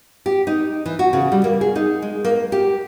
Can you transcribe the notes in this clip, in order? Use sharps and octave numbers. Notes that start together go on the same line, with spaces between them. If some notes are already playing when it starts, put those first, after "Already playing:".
G4
D#4
E3
F#4
C#3
G3
A#3
G#4
D#4
G#3
A#3
G4